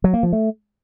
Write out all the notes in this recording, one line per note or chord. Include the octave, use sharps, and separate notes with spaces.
F#3
A#3
F3
A3